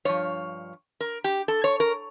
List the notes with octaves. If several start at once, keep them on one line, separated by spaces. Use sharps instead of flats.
G2 F3 C#5
A#4
G4
A4
C#5
A#4